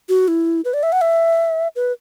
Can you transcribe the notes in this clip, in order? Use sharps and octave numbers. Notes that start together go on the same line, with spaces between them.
F#4
E4
B4
D5
E5
F#5
E5
B4